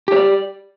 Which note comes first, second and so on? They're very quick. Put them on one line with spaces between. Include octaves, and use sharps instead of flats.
G4 C#5 D5